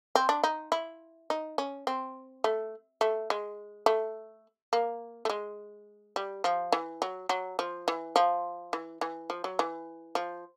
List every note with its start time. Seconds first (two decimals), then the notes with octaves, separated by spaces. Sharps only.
0.15 C4
0.29 D4
0.44 D#4
0.72 E4
1.30 D#4
1.58 C#4
1.87 C4
2.44 A3
3.01 A3
3.30 G#3
3.86 A3
4.73 A#3
5.25 A3
5.30 G#3
6.16 G3
6.44 F3
6.72 E3
7.02 F#3
7.29 F#3
7.59 F3
7.88 E3
8.16 F3
8.73 E3
9.01 E3
9.30 F3
9.44 F#3
9.59 E3
10.15 F3